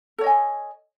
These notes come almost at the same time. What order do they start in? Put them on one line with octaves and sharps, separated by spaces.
A4 C#5 D#5 G#5